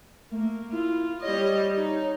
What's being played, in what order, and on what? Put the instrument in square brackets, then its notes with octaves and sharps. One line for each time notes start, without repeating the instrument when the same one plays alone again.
[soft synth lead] A3 [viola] A#3
[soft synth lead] E4 [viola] F4
[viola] G3 D#5 [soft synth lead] C#5
[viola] D#4